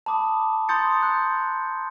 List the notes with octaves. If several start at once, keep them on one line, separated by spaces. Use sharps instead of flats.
A5 B5 D6 D#6
A#5 C6 D#6 G6 A6 C#7
C6 F#6